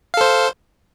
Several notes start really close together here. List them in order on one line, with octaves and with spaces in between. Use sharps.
F5 A4 C5